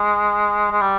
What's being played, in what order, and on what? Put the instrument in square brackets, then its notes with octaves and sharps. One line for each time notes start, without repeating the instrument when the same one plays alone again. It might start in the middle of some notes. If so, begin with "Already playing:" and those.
Already playing: [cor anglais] G#3
G#3
G3